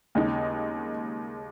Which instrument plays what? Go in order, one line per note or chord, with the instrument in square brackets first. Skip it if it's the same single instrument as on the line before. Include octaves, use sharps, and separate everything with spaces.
[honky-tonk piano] D#2 C#3 G#3 D#4